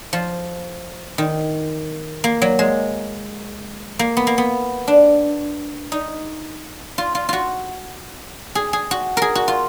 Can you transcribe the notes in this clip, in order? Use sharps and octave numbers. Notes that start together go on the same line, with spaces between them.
F3
D#3
A#3
F#3
G#3
A#3
B3
A#3
B3
D4
D#4
F4
F4
F4 F#4
G#4
G#4
F#4
G#4 A#4
F#4
F4